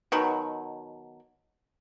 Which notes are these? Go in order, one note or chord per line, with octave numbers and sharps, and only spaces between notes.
B2 D#3 F#3